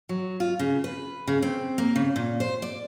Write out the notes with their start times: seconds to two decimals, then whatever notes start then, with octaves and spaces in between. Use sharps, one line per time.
0.09 F#3
0.40 F4
0.59 C#3
0.84 B4
1.27 C#3
1.42 C4
1.78 A#3
1.96 C#3
2.16 A#2
2.40 C5
2.62 D5